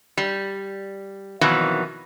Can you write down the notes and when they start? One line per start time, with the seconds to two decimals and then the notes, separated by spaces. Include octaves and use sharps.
0.18 G3
1.41 F2 B2 D#3 E3 F#3